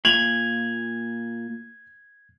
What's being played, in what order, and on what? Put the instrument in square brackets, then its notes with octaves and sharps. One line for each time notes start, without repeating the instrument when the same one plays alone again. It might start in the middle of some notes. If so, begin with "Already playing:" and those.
[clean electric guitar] A#2 [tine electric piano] G#6 [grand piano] F7 F#7